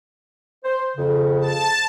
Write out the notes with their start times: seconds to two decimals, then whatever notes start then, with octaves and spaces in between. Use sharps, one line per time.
0.65 C5
0.97 F2 C#3
1.41 A5